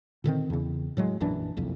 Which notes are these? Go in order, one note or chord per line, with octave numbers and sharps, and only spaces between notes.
A#2 D3 D#3 C4
E2 C#3
A2 F#3 G#3
A#1 F#2 E3 D4
F#1 C2 F2